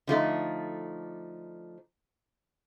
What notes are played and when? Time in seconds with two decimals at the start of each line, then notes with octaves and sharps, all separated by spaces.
0.07 D3 F3 A3 D#4